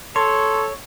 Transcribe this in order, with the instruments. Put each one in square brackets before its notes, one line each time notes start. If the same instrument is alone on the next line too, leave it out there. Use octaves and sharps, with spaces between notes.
[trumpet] A4 [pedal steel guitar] C#5 [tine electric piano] C6